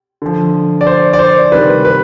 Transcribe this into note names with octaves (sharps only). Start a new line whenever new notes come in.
D3 F3
D5
C5
D5
C5
C3 D#3 G3 B4
B4